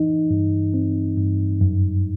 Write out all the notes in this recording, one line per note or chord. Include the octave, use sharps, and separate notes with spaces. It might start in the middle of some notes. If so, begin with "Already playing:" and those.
Already playing: E3 D#4
G2
C4
G2
F#2